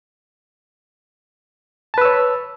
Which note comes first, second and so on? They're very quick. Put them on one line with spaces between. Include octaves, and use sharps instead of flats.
A5 B4 E6 C#5